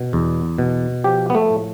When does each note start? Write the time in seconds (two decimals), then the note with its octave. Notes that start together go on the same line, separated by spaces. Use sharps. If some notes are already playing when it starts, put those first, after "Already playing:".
Already playing: B2
0.13 E2
0.58 B2
1.04 F3 G4
1.30 B3
1.35 A3
1.50 A2